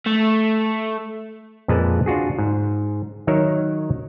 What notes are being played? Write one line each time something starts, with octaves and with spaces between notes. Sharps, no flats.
A3
F2 A#2 F3 G#3 B4 A5
D4 F4 F#4 G#4
G#2
D#3 F#3 D#4 A#4 C#5 E5